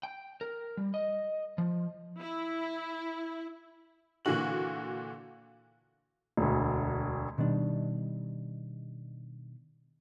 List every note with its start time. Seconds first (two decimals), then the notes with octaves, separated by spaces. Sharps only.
0.03 G5
0.41 A#4
0.77 G3
0.94 D#5
1.58 F3
2.20 E4
4.25 A#2 D3 E3 F#4 F#7
6.37 E1 D2
7.38 B2 D#3 G3 D4